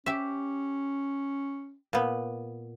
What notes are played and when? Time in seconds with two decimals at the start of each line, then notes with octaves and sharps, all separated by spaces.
0.06 C#4 G4 E5
1.93 A#2 B3